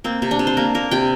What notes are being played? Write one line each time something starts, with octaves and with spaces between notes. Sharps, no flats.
A#3 C4
C3
D4
C3
C5
A#3 A#4
A#3 A#4
C3 G5